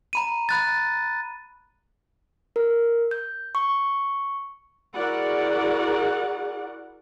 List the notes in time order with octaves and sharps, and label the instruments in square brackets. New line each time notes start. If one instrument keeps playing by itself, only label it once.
[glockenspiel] A#5 B5 D#7
B5 F#6 A6
[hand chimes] A#4
G6
C#6
[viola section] E4 F#4 G#4 A#4 D5 F#5